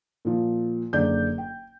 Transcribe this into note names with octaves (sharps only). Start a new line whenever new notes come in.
A#2 F3
F#1 D3 D5 G6
G5